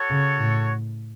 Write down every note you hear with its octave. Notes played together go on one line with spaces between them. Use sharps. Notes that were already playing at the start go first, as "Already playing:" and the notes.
Already playing: F#4 A4 C#5
C#3
A2